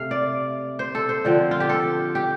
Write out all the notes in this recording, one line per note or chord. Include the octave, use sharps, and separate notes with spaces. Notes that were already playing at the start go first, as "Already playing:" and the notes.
Already playing: C3 A3 F5
D5
C5
A4
C5
D3 F3 C4
F4
G4
A4
G4